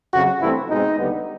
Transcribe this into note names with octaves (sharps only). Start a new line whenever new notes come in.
F2 C#3 F#3 F#4
G2 E3 A3 C4 E4
B2 G#3 C4 D#4
D#2 D3 G3 B3